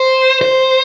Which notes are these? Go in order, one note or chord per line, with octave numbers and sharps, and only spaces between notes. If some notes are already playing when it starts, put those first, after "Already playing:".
Already playing: C5
C5